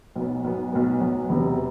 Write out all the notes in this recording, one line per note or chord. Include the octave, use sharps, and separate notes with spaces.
B1 B2 F#3 B3
B1 B2 F#3 B3
B1 B2 F#3 B3
B1 B2 F#3 B3
E1 E2 C3